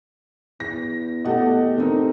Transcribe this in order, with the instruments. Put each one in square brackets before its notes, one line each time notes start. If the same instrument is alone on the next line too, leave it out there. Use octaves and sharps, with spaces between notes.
[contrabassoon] E2 [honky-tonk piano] A#6
[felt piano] B2 F#5 [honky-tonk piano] A3 G4 D#5
[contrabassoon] D3 [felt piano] C4 D#4 A#4